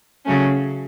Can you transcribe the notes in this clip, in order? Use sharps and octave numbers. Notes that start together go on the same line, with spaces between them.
C#3 F#3 A3 C#4